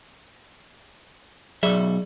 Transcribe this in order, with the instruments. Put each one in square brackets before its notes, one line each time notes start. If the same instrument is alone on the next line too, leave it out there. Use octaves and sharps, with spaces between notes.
[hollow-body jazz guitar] B1 E5 [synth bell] F#3 G#4 D5